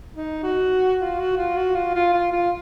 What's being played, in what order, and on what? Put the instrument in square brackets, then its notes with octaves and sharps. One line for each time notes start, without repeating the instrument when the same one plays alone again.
[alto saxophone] D#4
F#4
F4
F#4
F4
F#4
F4
F4
F4
F4